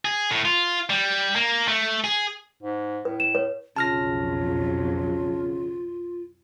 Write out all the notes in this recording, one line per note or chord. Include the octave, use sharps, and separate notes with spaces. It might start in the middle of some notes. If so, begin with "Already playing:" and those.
G#4
A2
F4
G3
A#3
A3
G#4
G#2
A2 B4
E7
B4 C#5
B1 F2 C#3 F#3 F4 A5 F6 A#6